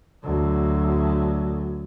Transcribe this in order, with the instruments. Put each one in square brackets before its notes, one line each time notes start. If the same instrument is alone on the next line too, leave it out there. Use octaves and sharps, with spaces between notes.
[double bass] D2 F#3